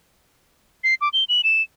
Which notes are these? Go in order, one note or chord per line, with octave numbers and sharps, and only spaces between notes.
C7
D6
G7
F#7
E7